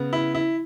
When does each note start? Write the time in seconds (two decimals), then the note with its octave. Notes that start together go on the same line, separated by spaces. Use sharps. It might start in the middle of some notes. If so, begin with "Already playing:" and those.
Already playing: C#3 B3
0.13 E4
0.35 E4